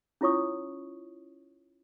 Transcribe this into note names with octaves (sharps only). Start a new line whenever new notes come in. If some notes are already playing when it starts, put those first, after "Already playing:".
C#4 E4 F4 C#5 C#6 D#6